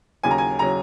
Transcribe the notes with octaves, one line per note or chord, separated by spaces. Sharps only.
D#2 C#3 F#3 G#5
A#5
G#5
C#3 F#3 A#5